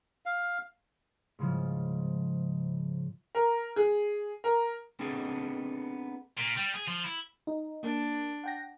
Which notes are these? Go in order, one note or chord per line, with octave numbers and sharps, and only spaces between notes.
F5
G#2 C#3 F3
A#4
G#4
A#4
B3 C4 D4 D#4 G#4 A4
A#2
G3
G#4
F3
E4
D#4
A#3 D4
F#5 G5 A#6